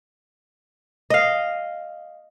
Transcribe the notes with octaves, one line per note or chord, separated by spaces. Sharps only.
D#5 F5